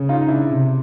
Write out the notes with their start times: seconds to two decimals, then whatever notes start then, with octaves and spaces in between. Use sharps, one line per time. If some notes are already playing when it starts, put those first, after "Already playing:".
Already playing: C#3
0.09 D#4 F4
0.21 D#4
0.28 D4 E4
0.48 C3